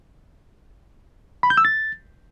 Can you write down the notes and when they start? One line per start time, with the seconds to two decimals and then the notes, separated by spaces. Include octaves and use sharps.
1.43 B5
1.50 G6
1.57 E6
1.65 A6